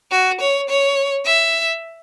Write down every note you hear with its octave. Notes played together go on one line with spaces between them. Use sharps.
F#4
C#5
C#5
E5